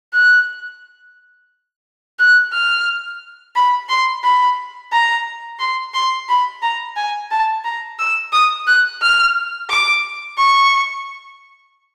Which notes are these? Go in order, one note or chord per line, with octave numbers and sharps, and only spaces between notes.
F#6
F#6
F6
B5
C6
B5
A#5
C6
C6
B5
A#5
G#5
A5
A#5
E6
D#6
F#6
F6
D6
C#6